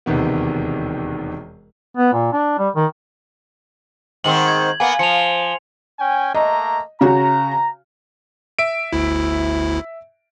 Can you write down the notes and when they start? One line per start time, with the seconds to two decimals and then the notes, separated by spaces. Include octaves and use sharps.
0.06 E1 D#2 C3 D#3 B3
1.97 B3
2.13 A#2
2.33 D4
2.58 G3
2.76 D#3
4.24 G#2 D#3 C4 F#7
4.48 G#6
4.80 A#3 B3 G#5
4.99 F3 C#7 F7
5.99 C#4 G5 G#5
6.34 A3 A#3 D#5 A#5
7.01 C#3 F#4 A#5
8.59 E5 D7
8.92 G1 D2 E4